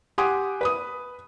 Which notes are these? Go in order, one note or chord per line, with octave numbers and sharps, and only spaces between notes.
G4 F#5 G#5 C6 D6 D#6
B4 B5 D#6